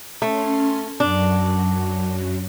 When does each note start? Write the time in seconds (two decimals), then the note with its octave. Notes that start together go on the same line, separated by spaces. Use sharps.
0.22 A3 C#4 C6
1.00 F#2 F#3 D4